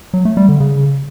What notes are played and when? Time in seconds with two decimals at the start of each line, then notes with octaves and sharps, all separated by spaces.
0.14 F#3
0.25 A3
0.37 G3
0.49 D3
0.60 C#3